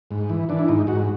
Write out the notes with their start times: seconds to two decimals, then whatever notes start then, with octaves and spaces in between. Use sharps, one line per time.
0.11 G#2
0.30 E3
0.49 E3 D4
0.59 E4
0.68 G#2 D#4
0.87 G#2 F#4